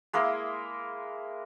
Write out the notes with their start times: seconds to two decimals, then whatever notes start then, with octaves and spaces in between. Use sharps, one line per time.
0.13 G#3 A#3 E4 A#4